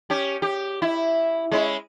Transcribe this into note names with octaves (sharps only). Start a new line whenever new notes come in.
C#4 G4
G4
E4
G#3 C#4 E4